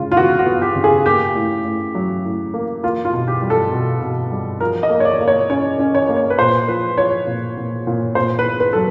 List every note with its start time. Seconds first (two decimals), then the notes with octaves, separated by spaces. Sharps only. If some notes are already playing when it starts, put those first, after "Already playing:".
Already playing: C#3 G#3 F4
0.12 F4
0.17 B3 F#4
0.39 F#4
0.46 B3
0.62 G4
0.76 C#3
0.84 G#4
1.05 A#3 G4
1.35 A2
1.65 A2
1.95 F#3
2.24 A2
2.54 A#3
2.83 A#3 F4
3.05 F4
3.13 B2
3.28 G4
3.42 G3
3.50 A4
3.72 B2
4.02 B2
4.31 G3
4.60 F3 A#4
4.83 D#5
4.90 A#3
5.00 C#5
5.05 D5
5.20 A#3
5.28 C#5
5.50 C#4 C#5
5.79 C#4
5.95 C#5
6.09 A#3
6.17 C#5
6.30 B4
6.39 A#2 C5
6.68 F3 B4
6.98 F3 C#5
7.27 A#2
7.57 A#2
7.87 A#2
8.15 A#2 C5
8.39 B4
8.46 B3
8.60 B4
8.73 F#3 A4